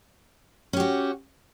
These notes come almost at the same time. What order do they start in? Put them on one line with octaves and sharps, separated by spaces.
C#4 G4 F#4